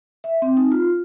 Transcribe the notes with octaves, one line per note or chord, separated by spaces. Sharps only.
E5
C4
D#4
F4